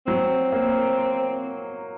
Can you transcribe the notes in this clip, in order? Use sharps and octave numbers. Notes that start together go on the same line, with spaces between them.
F#3 C4
A#3